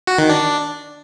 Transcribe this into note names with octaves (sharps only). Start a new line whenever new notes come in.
F#4
D#3
D4